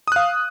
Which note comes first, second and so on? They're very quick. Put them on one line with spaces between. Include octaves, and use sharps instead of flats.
D#6 F#6 F5